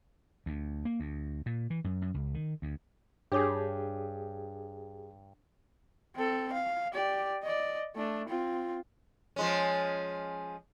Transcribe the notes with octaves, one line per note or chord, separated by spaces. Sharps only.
D2
A#3
D2
A#2
E3
F#2
F#2
C#2
D#3
D2
G2 D4 G4 G#4 C#5 D6
C4 A4
F5
G4 D5
D5 D#5
A3 D4
C4 F4
F3 G#3 C#4